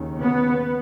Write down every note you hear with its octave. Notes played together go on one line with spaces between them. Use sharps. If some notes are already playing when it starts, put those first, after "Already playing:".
Already playing: D#2 C#3
B3